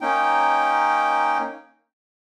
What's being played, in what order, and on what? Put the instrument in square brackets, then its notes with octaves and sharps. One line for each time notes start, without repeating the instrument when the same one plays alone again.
[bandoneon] A#3 C#4 D#4 G5